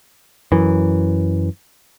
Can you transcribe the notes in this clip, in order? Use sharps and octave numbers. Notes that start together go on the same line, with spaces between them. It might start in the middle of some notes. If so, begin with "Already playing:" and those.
F#2 E3